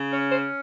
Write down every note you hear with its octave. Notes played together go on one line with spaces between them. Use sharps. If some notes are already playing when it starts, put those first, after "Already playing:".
Already playing: C#3
C#4 C#5
C5